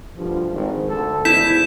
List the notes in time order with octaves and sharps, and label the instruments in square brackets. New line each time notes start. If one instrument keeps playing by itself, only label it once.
[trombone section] D2 G2 F3
G#1 G#2
D2 A4
[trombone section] E2 G#2 B2 [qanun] E4 [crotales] G6 B6 E7